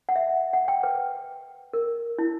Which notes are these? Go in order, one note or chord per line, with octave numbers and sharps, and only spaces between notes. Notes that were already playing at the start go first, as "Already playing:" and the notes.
F#5
E5
F#5
G5
B4
A#4
E4